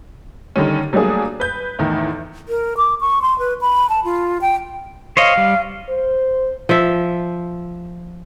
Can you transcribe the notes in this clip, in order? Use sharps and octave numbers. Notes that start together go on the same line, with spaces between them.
D3 D#3 G3 C#4
F#3 G3 A3 A#3 D4 G#4
B4 G6
E2 A2 D#3
A#4
D6
C#6
C6
B4
B5
A5
F4
G5
C5 C#5 D#5 F5
G3
C5
F3 E5